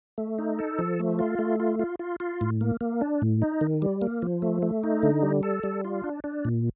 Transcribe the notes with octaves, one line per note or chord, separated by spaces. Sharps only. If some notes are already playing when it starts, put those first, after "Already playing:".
A3
D#4
A4
F3
A3
F4
A3
F4
F4
F4
F4
A2
A#3
A#3
D4
A2
D#4
D#3
G3
A#3
F3
A3
A3
D#4
D3
G3
A4
G3
F4
D4
D4
A#2